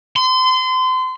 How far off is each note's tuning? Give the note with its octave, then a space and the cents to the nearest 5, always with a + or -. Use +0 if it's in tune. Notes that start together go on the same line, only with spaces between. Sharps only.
C6 -30